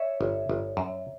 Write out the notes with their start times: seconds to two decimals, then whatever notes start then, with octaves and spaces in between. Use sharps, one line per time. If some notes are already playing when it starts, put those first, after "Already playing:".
Already playing: C#5 D5 E5
0.21 G1
0.49 G1
0.77 F#2